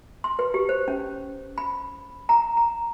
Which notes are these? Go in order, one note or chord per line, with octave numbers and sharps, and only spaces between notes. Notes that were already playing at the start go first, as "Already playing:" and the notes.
C6
B4
G4
C5
C#4
B5
A#5
A#5